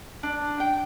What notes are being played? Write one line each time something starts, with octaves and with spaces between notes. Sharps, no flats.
D4
G5